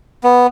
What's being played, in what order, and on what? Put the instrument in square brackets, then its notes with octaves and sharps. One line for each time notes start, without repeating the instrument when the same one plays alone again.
[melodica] B3